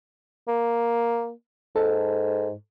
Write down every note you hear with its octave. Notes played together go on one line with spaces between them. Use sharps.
A#3
G#2 A4